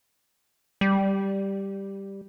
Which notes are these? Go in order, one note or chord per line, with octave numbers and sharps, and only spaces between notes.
G3